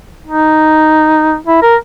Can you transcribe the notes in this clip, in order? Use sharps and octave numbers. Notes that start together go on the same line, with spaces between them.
D#4
E4
A#4